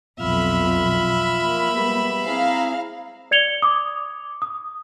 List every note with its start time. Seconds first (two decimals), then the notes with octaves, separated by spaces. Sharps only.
0.19 B1 F2 B2 F3 F4 E5 B5 F6
1.43 A#3
1.75 G3 G#3 B3
2.26 C4 E4 G#4 F5 A#5
3.31 D5 G#6 C#7 F7 G7
3.62 D6 D#6
4.42 D#6